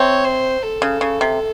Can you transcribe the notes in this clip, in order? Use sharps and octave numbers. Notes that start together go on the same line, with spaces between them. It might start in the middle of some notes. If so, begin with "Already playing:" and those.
Already playing: C3 C4 C#5
C5
A4
C#3
C#3
C3